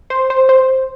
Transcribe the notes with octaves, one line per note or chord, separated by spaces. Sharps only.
C5
C5
C5